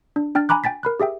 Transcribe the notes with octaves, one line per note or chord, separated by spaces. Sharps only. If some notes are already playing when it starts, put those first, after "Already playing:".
D4
D4 G5 F6 A6
G#5 A#5 B5 D6 F#6
G5 G#5 A6 B6
A#4 B5 F#6
G4 G#4 E5 G5